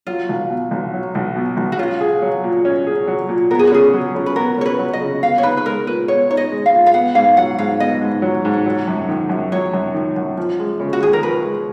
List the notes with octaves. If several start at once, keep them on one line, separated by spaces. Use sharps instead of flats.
F#3 F4
B1
B2
B1
F#3
B1
B2
B1
F#4
C#4 F4
G#4
F#3
A#2
C#4
G#4
F#3
A#2
B3 A#4
G#4
F#4
C#3 G#4
F#3
C#3
B4
B3 A#4
C#3 C#5
B4
F#3
D#5
C#3
B3 F5
C#5
D#4 B4
B4
G#3 A#4
A#2 B4
B3 C#5
D#4 C#5
D#5
G#3
F5
A#2
F5
B3 F#5
G#2 F5
F#3 F#5
G#2 F5
B3 D#5
G#2
F#3
G#2
F#3
F#2
D#3
F#2
F#3 C#5
F#2
D#3
F#2
F3
G#3
C#3
F#4
D#2 G#4
A#4
F3 B4
G#3